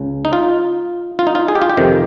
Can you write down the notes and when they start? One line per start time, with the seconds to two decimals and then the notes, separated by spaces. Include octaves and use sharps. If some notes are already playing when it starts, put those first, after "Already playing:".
Already playing: C#2 C#3
0.25 D#4
0.33 F4
1.19 F4
1.27 D#4
1.35 F4
1.48 G#4
1.55 G4
1.62 F4
1.70 G4
1.77 F2 C3 D#3